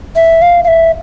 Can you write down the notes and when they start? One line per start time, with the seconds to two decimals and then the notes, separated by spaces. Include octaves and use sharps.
0.16 E5
0.42 F5
0.64 F5
0.68 E5